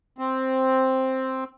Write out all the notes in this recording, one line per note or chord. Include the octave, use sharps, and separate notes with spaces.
C4